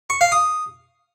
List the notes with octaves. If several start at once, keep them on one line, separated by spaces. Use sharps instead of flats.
C#6
F5
D#6